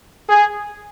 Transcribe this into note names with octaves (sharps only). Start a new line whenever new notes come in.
G#4